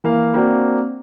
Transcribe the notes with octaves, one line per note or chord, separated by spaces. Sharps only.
E3 A#3 F5
A#3 C4 D4 F#4